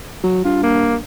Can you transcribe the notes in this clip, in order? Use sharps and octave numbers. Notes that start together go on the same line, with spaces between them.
F#3
G2 F4
A#3